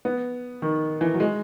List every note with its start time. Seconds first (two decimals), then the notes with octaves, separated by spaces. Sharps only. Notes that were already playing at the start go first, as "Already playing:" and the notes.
0.05 B3
0.62 D#3
1.01 E3
1.14 F#3
1.20 G#3